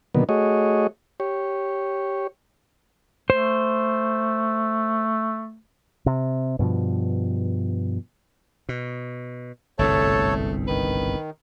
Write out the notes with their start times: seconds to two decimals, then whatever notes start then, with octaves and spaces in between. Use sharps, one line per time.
0.15 B2 D3 D#3 F#3 A#3 B3
0.29 A3 F#4 G#4 C#5 D#5
1.20 G4 C#5
3.30 A3 C5
6.06 C3
6.59 G2 B2 F3
8.69 B2
9.79 G1 C2 G#2 A3 A4 C#5 A5
10.67 D#3 B4